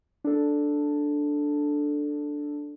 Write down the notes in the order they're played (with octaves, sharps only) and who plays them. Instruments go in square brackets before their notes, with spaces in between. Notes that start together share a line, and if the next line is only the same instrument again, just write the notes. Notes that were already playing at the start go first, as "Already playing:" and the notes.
[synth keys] D4 A4